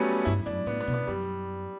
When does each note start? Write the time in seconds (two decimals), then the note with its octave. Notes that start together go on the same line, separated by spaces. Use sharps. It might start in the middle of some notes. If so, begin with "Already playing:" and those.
Already playing: F#3 G3 A3 B3 C#4
0.25 G2 E4
0.46 F#2 D4
0.66 A2 B3
0.80 B3
0.88 B2
0.94 B3
1.07 F#2 G3